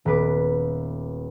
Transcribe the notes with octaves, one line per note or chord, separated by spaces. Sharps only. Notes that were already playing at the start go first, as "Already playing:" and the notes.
D#1 B3 B4 D6